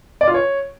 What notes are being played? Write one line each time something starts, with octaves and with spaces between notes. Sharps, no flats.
D5
F4
C#5